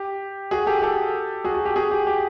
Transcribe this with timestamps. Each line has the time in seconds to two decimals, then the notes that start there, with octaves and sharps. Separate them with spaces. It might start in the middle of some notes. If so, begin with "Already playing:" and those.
Already playing: G4
0.51 F#4 G#4
0.67 G4 A4
0.82 G4 A4
1.44 F#4 G#4
1.54 F#4
1.65 G4
1.76 F#4 G#4
1.91 G4
2.07 G4